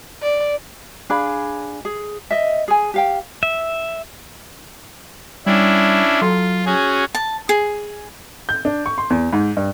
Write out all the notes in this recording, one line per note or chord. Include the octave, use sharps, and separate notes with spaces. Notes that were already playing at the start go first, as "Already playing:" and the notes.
D5
D4 G#4 F5 B5
G#4
D#5 E5
G#4 G#5
G4 F5 G5
E5
G3 C#4 D4 E4
F#3 F4 A4 C6
C#4 F#4 G#4
A5
G#4
G6
D4
C#6
C6
E2
G#2
G2